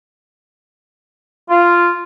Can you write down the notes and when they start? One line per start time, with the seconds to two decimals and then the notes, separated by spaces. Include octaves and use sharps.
1.49 F4